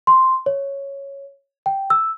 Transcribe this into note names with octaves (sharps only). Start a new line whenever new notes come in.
C6
C#5
G5
E6